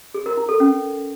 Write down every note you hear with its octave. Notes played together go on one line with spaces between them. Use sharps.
G#4
A#4
E4
A4
C#4